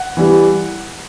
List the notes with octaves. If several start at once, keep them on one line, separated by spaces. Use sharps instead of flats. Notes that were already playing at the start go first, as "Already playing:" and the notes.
Already playing: F#5
E3 G3